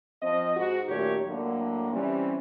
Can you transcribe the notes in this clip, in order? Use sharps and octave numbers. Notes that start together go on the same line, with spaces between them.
F3 C4 D#5
G#2 F#4
F#2 A#2 D#3 A3 G4 C#5
A2 D3 F#3 A#3
C3 E3 G3 C4 C#4